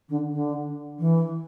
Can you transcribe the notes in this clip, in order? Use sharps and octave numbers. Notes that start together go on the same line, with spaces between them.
D3
D3
E3